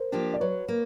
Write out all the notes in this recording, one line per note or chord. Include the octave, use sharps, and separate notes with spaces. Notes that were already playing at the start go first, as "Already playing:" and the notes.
Already playing: A#4 C5
F3 A#3 D4 G4
D5
F#3 B4 C#5
A#3